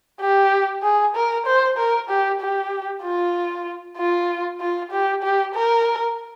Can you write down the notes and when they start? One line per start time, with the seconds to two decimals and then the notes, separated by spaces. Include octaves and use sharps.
0.21 G4
0.83 G#4
1.16 A#4
1.46 C5
1.78 A#4
2.10 G4
2.41 G4
3.03 F4
3.98 F4
4.61 F4
4.92 G4
5.23 G4
5.55 A#4